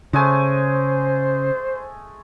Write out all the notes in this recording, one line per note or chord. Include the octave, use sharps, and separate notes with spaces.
C#3 G#3 A3 C5 G#5